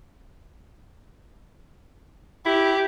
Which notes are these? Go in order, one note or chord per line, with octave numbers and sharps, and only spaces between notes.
E4 G4